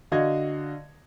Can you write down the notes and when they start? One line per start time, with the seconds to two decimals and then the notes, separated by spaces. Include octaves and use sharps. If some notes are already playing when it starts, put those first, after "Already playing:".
0.12 D3 F#4 D#5 F5 G#6